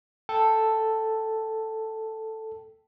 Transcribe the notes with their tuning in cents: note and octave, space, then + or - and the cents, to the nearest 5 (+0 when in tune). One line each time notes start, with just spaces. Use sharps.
A4 +5 G5 -5